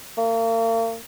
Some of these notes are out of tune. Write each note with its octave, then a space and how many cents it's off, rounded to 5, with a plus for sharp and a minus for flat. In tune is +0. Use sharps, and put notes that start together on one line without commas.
A#3 -40